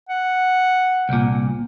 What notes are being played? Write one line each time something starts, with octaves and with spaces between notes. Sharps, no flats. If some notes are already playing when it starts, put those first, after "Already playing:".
F#5
C2 A#2